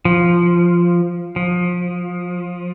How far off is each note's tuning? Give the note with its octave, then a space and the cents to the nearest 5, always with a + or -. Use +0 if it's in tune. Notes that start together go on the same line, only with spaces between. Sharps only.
F3 -5
F3 +20